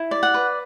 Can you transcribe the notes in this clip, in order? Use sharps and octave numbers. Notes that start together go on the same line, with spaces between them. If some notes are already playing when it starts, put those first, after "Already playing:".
Already playing: E4
D5
F#5
B4